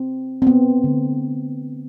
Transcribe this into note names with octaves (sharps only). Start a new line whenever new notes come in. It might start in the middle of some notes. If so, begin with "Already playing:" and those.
Already playing: C4
C4
B3
D3 A3